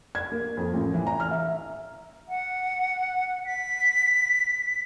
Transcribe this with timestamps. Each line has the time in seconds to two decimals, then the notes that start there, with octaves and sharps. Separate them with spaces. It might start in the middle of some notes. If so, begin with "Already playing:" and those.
0.15 G#6
0.32 A#3
0.57 F2
0.74 A1
0.94 E3
1.07 A#5
1.20 F6
1.31 E5
2.29 F#5
3.46 B6